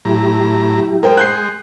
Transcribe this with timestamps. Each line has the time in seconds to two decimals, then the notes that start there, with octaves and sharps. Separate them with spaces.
0.05 A2 F#3 E4 G4 A#5
1.03 G#3 A#4 C5 G5
1.17 F#6 G6 C7